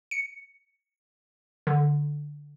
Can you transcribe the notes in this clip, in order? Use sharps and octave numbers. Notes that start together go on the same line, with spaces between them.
C#7
D3